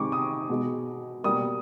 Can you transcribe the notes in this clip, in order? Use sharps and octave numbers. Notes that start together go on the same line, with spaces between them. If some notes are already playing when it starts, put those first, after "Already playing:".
Already playing: C3 D#3 G#3 C#6 D6
D#6
B2 G#3
B2 G3 A#3 D#6